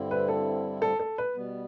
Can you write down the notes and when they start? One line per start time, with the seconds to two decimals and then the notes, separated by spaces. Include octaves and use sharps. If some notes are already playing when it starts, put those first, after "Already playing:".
Already playing: G2 D3 G3 C4 E4
0.11 B4
0.28 A4
0.82 A4
1.00 A4
1.18 B4
1.36 B2 G3 B3